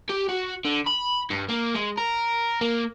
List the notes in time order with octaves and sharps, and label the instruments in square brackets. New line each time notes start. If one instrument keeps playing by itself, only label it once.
[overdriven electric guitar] G4
F#4
D3
B5
G2
A#3
G#3
A#4
A#3